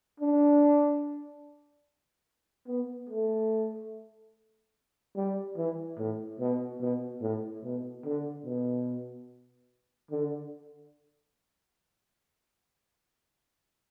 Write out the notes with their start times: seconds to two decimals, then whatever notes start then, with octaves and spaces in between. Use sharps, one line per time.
0.20 D4
2.68 B3
3.10 A3
5.16 G3
5.57 E3
5.98 A2
6.40 B2
6.81 B2
7.21 A2
7.64 B2
8.05 D3
8.46 B2
10.11 D3